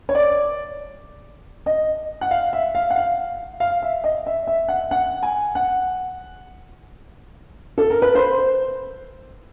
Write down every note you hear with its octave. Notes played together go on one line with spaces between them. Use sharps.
C#5
D5
D#5
F#5
F5
E5
F5
F#5
F5
F5
E5
D#5
E5
E5
F#5
F#5
G#5
F#5
A4
A#4
B4
C5